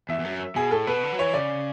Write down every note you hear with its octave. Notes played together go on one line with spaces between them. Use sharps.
E2 E5
E2
F#2
B2 G#4
A2 A4
B2 B4
D3
F#3
E3 C#5
C#3 D5